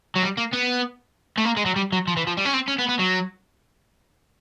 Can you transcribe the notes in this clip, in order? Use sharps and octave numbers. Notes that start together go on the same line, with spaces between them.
F#3
G3
A#3
B3
A3
A#3
G#3
F#3
G3
F#3
F3
E3
F3
G3
C#4
C4
C#4
B3
B3
F#3